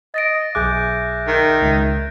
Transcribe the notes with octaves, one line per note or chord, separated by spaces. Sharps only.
D#5 A6 A#6 D7
B1 G#4 E5 D6 F#6 G6
D#3
C#2